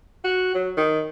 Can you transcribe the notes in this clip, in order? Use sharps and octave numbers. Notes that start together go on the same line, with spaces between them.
F#4
F#3
D#3